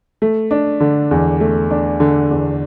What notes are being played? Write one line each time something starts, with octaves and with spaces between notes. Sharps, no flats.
A3
D4
D3
E2
A3
D4
D3
E2